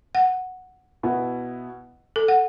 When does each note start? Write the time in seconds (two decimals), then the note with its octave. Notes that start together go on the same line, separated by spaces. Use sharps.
0.15 F#5
1.03 B2 B3 E4
2.16 A4
2.28 F#5